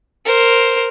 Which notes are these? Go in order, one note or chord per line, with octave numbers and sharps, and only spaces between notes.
A#4 C5